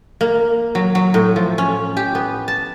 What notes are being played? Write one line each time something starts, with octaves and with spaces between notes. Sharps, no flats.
A#3
F#3
F#3
A2
F3
C#4
G4
B3
A5